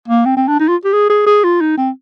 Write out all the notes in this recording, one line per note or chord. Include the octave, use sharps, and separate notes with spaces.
A#3
C4
C4
D4
D#4
F4
G4
G#4
G#4
G#4
F4
D#4
C4